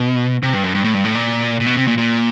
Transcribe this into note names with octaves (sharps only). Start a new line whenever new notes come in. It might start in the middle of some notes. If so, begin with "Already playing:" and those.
Already playing: B2
C3
G2
F#2
G2
A2
G2
A2
A#2
A#2
B2
C3
A#2
A#2